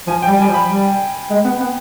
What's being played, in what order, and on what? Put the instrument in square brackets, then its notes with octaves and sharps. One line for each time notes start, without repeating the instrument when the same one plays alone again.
[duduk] F3 [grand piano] G#5
[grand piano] G5
[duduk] G3
[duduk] G3 [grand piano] G#5
[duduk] F3
[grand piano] B5
[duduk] G3
G#3
B3
B3